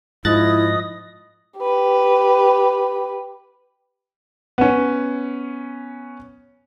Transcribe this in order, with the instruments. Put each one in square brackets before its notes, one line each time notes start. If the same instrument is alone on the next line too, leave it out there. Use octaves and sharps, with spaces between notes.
[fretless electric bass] G#2 [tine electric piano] F3 F#6 A6 [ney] E4 [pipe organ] D#5 D#6
[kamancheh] G4 B4
[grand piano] B3 C#4